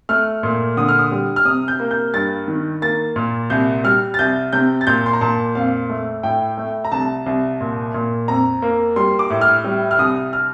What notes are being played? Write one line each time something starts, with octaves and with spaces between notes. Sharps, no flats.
A3 F6
A#2
D3 D#6
F6
D#6
G3
F6
C3 D#6
G6
A#3
G6
G2 A6
D#3
A#3 A6
A#2
C2 G6
G3 F6
A6
C2 G6
C3 G6
A6
A#2 G6
C6
A#5
A#2 A5
F2 F5
A3
A2 G5
A3
A#5
C2 A5
C2
A#2
A#2
F2 A#5
A#3
G3 C6
D6
A2
F6
G3
F6
C2 D#6
F6